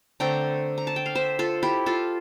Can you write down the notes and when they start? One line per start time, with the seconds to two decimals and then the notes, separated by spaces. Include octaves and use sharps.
0.20 D3 A3 C4 G5 A#5
0.78 A#5
0.87 A5
0.96 G5
1.06 F5
1.15 C5 E5
1.39 F4 A4
1.63 E4 G4
1.86 F4 A4